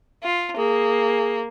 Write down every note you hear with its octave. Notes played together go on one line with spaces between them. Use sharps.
F4
A#3 G#4